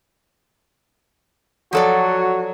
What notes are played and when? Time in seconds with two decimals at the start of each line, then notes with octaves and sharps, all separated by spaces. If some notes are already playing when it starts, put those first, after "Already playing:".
1.73 F3 F#3 F#4 A4 D5